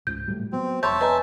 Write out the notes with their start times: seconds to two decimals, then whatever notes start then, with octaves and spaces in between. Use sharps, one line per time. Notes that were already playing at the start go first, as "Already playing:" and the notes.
0.07 C#2 G#2 G6
0.28 A2 F#3 G3
0.52 F#3 B3 C4
0.83 E1 E2 C#5 E5 A5 B5 C6 G6
1.01 B4 D#5 G#5 A#5